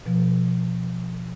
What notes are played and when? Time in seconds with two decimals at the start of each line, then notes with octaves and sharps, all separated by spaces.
0.06 B2 F3